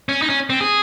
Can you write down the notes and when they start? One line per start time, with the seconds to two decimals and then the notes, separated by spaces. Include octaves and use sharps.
0.09 C#4
0.22 D#4
0.29 C#4
0.50 C4
0.61 G#4